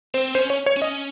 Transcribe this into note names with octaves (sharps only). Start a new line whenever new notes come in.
C4 C5
C#4 C5
C#5
C#5
C#4
D#5